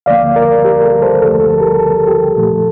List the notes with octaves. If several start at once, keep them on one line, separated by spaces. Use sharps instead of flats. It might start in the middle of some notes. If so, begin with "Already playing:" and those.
D2 D3 F3 A#3 D5 F5
A#4 D5
G4 A#4
A4
A4 C5
D2 D3 F3 A3 A4
A4
G4 A#4
A4
G4
A#2 F3 A3 A4